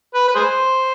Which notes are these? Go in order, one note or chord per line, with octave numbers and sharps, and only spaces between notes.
B4
B4
G#4 C5